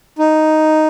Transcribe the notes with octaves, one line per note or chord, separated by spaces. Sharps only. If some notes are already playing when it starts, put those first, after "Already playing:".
D#4